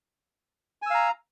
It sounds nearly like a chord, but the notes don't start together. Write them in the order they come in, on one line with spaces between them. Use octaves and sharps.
G#5 E6 F5 A#5